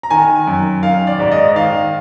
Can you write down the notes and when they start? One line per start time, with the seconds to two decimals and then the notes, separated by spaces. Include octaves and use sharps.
0.03 A#5
0.10 D#3 G#5
0.47 F#2
0.83 D#3 F5
1.07 D5
1.19 G#2 D5
1.31 D#5
1.56 D#3 F5